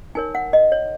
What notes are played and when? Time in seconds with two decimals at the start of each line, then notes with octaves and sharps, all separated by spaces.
0.15 D#4 A#4 C#5 G#5
0.35 F#5
0.53 D#5
0.72 C#5